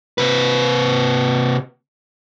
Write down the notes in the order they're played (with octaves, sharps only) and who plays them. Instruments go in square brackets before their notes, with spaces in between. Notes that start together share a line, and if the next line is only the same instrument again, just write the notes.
[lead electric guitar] C3 B4